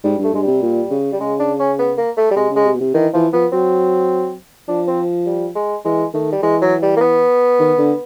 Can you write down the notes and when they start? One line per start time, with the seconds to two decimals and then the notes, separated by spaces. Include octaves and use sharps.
0.04 G#2 G3
0.18 G2
0.24 A3
0.33 G2 G#3
0.42 G3
0.47 C3
0.62 A#2
0.91 C#3
1.12 G3
1.20 C#3 G#3
1.40 D4
1.59 C#4
1.79 B3
1.98 A#3
2.17 A3
2.31 G3
2.36 C3 G#3
2.51 C#3
2.56 G#3
2.65 C3
2.75 B2
2.80 C3
2.94 D#3 E3
3.14 E3 F3
3.33 F3 B3
3.52 F#3 C4
4.68 F3 D4
4.88 C4
5.26 G3
5.55 G#3
5.85 E3 G#3
6.14 D#3 A3
6.32 G3
6.43 E3 G#3
6.62 F#3
6.82 G3
6.97 A#3
7.01 B3
7.59 D#3
7.79 D3